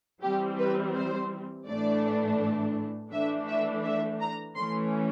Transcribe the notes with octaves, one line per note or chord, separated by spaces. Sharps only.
E3 G3 C4 G4
B4
C5
A2 E3 A3 D4 D5
E3 A3 D4 E5
E5
E5
A#5
E3 A3 C#4 C6